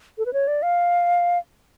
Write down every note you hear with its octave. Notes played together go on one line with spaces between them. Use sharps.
A4
B4
C#5
D5
F5